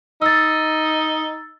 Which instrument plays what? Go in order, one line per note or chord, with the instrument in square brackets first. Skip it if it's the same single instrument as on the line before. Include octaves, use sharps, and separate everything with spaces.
[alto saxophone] D#4 [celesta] E6 A6